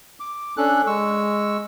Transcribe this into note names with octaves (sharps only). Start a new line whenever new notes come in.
D6
C#4 D4 A4 F#6
G#3 C#6 E6